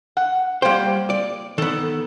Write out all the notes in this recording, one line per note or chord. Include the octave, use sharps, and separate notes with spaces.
F#5
G3 A#3 C5 G5
D5
D#3 B3 A4